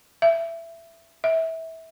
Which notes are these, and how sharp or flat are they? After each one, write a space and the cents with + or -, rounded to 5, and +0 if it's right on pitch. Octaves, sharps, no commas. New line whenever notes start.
E5 +15
E5 -20